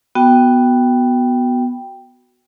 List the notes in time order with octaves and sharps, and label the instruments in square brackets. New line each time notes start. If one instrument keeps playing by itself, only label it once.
[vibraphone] B3 F#4 G5